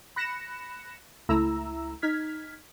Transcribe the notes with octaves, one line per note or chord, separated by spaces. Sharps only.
B5 F#6 A#6 C#7 E7
C#2 A3 E4 A#5 E6
D#4 F6 G#6 B6